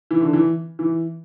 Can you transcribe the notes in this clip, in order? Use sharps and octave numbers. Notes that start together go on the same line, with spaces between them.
E3
D3
E3
E3